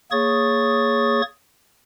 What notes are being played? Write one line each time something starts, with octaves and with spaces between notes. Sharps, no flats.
A#3 G#4 C#5 C#6 D#6 A6